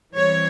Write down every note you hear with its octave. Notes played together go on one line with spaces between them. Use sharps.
E3 G3 C4 C#5